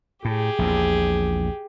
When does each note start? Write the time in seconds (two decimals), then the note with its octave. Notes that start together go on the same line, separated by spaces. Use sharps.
0.25 A2 G4 G#4
0.59 A#1 E2 A#2